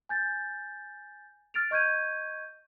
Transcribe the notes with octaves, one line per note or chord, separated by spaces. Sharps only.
G#5 G6 A6
F6 A6 D7 F7
D#5 C#6 G6 G#6 D#7